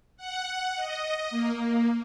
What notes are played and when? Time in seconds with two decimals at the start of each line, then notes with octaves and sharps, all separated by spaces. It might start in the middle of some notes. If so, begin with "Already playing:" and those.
0.17 F#5
0.75 D#5
1.30 A#3